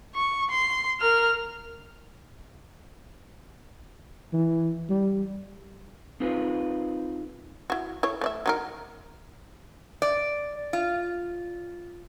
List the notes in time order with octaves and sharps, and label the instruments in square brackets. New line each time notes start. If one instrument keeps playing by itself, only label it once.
[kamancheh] C#6
C6
A#4 F6
[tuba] E3
G3
[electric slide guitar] C4 D#4 F4 G#4 B4
[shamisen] E4 F#4
E4 A4 C#5
A3 D5 E5
F#3 D#4 A#4
[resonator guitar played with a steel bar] D5
F4